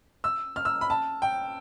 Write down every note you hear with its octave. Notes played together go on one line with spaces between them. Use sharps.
E6
F6
E6
B5
A5
G5